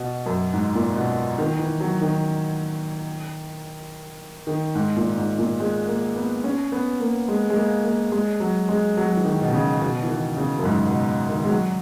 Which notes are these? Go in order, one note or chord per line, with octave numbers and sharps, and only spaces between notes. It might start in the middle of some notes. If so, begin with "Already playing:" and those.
Already playing: B2
F#2
G#2
A#2
B2
D#3
E3
F#3
D#3
D#3
G#2
A#2
G#2
A#2
G#3
A#3
B3
C#4
B3
A#3
G#3
G#3
A#3
A#3
G#3
F#3
G#3
F#3
F#3
E3
D#3
B2
C#3
B2
E3
D#3
C#3
F#2
G#2
B2
D#3
G#3
F#3